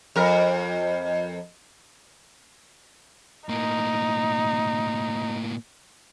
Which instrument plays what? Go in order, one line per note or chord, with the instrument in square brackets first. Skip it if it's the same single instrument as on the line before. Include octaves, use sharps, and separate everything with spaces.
[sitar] F2 A#4
[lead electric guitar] A2 A#3 [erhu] D#4